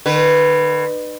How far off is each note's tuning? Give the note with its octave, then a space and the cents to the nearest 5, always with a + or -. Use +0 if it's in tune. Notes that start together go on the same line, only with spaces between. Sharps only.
D#3 -45 B4 +0